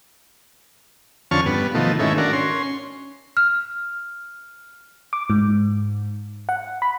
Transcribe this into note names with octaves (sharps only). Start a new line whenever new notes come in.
F2 D3 C#4 A5 C#6 F6
G2 B3
B2 D#3 F3 A3
G#2 D#3 A3 C#4 E4
D4 F#4 A#4
C#4 C6
F6
D6
G#2
F#5
B5